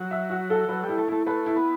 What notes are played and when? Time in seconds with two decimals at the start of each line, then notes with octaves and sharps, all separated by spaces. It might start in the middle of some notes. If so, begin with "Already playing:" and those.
Already playing: F#3
0.11 E5
0.30 F#4
0.50 A4
0.68 F#3 B4
0.83 G3
0.88 E4
0.98 A3
1.08 A3 E4
1.27 A3 B4
1.46 E4
1.56 B3